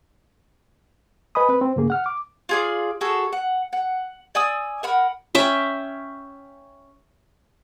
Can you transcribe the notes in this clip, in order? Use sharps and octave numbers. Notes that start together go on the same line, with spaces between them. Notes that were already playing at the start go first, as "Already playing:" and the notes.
B4 D#5 G#5 B5 D#6
C4 B4
C4
G2 C#3 A#3 G#4
F#5 F6
D6
F4 G#4 D5
F#4 G#4 A4
F#5
F#5
D5 G#5 D#6 E6
A#4 F#5 B5
C#4 E5 G5